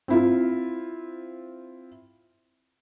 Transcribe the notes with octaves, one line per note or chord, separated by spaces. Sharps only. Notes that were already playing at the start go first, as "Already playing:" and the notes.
C4 E4 F4